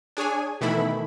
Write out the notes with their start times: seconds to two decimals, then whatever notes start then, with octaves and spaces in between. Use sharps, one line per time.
0.17 D4 G#4 C#5 G#5
0.61 B2 D#3 E3 A3 E4 B5